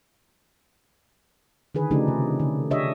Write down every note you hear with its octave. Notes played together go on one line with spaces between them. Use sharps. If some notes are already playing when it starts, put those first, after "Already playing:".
D3 D#3 G#4 B4
C#3 F3 A3 D4 D#4 G4
C3
D3
D4 G4 C#5 D#5 E5